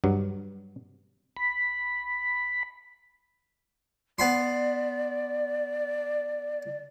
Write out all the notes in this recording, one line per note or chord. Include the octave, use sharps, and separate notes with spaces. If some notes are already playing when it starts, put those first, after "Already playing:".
G2 F#3
B5
B3 D5 B5 C6